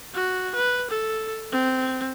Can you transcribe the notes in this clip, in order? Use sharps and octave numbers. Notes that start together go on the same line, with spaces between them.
F#4
B4
A4
C4